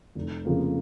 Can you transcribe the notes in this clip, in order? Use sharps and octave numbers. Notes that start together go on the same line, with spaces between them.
F1
F2 C#3 F3 A#3